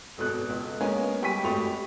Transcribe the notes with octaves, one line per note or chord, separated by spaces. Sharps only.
G#1 B2 B3 A4 F#6
C#2
G#3 A#3 B3 C#4
G3 G5 G#5 C#6 B6 D#7
G#1 A3 F#4 B5 C#6 F7
G4